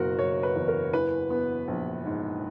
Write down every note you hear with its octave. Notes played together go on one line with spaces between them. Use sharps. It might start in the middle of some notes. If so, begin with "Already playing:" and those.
Already playing: F#1 B2 F#4 A#4
F#1 C#5
B4
E2
A#4
E3 B4
B3
A#1
G#2